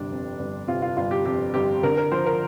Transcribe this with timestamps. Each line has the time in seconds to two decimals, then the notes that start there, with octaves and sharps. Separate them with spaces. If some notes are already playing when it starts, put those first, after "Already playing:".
Already playing: G1 C3 D4
0.11 F2
0.39 G1
0.68 C3 F4
0.82 F4
0.97 G1 F4
1.11 G4
1.25 F2 G4
1.54 G1 G4
1.83 D3 A#4
1.97 A#4
2.12 F3 C5
2.26 A#4